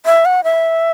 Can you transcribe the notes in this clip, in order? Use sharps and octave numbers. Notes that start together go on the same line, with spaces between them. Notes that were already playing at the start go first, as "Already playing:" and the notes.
E5
F#5
E5